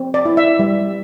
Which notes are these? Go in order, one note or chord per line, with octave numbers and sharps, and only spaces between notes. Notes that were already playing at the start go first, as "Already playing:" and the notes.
Already playing: C4
D5
E4
E5
G3